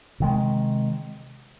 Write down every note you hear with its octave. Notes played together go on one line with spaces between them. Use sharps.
C3 D#3 G#3